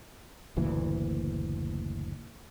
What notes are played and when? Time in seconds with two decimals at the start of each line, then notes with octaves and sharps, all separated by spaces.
0.57 F#1 D2 A#2 E3